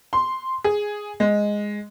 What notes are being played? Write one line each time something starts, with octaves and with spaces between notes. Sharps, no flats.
C6
G#4
G#3